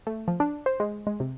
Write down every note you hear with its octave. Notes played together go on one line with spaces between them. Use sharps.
A3
F3
D4
C5
G#3
G#3
C3